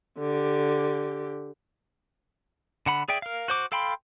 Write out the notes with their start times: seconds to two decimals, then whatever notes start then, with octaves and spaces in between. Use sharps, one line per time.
0.19 D3 G4
2.86 D3 F#5 B5
3.08 G#4 D5 E5 G5
3.22 A#4 F5
3.48 F#4 C5 D6
3.72 A4 F5 G5 B5 C6